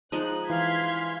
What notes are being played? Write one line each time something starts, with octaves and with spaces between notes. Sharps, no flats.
F3 G#3 D#4 F#6
E3 F5 C6 G#6 B6